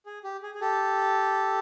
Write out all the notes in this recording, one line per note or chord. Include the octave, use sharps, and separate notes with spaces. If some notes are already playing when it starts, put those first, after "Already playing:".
G#4
G4
G#4
G#4
G4 A4